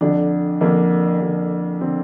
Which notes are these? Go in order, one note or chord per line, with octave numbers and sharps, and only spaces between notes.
F2 D3 D4
F2 D3 A#3
F2 D3
D3 C4